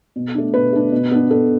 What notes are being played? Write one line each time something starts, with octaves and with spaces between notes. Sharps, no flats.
B2
A3 D4
B2 B4
A3 D4
B2
B3 D4
B2 A4